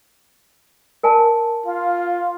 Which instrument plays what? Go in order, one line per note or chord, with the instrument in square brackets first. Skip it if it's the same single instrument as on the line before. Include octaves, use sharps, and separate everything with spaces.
[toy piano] A#4 G#5 A5
[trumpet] F4 [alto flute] F5